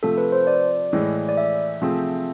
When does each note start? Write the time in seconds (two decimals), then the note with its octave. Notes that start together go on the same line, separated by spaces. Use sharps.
0.03 C3 F3 A3 A4
0.17 B4
0.32 C5
0.47 D5
0.93 A2 E3 G#3
1.29 D5
1.37 E5
1.81 C3 F3 A3 C4 G#4